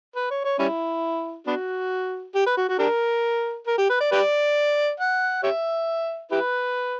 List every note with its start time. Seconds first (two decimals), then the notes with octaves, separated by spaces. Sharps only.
0.16 B4
0.30 C#5
0.44 C#5
0.59 G3 C#4 E4
1.47 B3 D4 F#4
2.35 G4
2.46 B4
2.57 F#4
2.69 F#4
2.79 D4 G4 A#4
3.67 A#4
3.78 G4
3.89 B4
4.00 D5
4.12 G4 B4 D5
5.00 F#5
5.43 G4 C#5 E5
6.31 E4 G4 B4